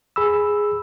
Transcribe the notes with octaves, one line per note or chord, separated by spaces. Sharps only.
E2 G#4 B5 E6